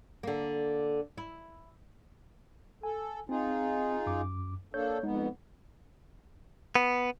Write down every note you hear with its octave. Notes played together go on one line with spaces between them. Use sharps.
D3 A#3
E4
A4 G#5
C4 D#4 F4 G#4
F#2 D6
A#3 D4 A4 C#5 G6
F2 G#3 B3 D#4
B3